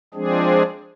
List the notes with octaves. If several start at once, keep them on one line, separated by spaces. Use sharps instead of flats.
F3 G#3 C4 D4 G#4